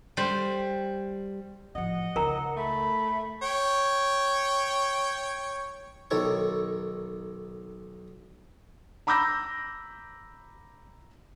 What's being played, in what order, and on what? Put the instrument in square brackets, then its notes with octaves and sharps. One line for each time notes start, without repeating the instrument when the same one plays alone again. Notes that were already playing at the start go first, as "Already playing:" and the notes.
[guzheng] G3 C5
[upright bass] A1 F3 [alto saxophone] D#5 [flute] F#5
[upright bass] C#2 D#4 [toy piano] A#4 A#5
[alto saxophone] A3 [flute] B5
[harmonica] C#5 G5
[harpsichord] B1 D#3 A4 C#5 C#6
[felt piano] A#5 B5 D6 E6 G6 A#6